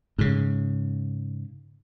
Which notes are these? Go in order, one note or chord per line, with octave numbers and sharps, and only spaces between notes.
G#2 C#3